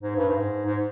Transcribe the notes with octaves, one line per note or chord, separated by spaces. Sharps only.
G#2
G2
G#2
G#2